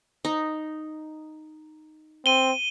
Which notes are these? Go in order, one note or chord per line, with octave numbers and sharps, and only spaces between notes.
D#4
C4 D#7 G7